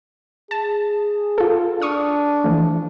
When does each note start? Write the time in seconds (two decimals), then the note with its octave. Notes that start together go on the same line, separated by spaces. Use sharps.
0.51 G#4 A5
1.38 F4 A4
1.82 D4 C#6 D#6 F6
2.44 E3 F3 A3